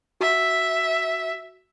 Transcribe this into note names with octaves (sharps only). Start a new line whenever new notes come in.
F#4 E5